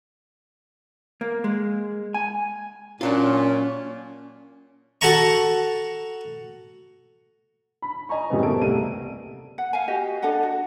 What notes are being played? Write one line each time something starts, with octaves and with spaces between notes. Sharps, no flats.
A#3
G#3
G#5
A#2 F#3 C#4 D4 F4
F#4 A4 F#5 A5 A#5 C#6
B5
D#5 G#5 A#5 C#6
F#2 A2 C#3 G3 B3 C4
E2 A#3 G4 A4 D7
C2 A3 D#7
F#5
F5 G#5
F#4 G4 D#5
D4 A4 D#5 F#5
F#4